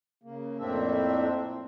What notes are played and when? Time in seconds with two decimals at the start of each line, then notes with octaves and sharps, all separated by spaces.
0.23 C#3 A#3
0.59 F2 A2 A#3 C4 D4 E5